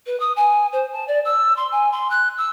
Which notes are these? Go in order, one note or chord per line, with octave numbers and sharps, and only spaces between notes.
B4
D#6
G#5
C5
A5
D5
E6
C6
G#5
C6
F#6
E6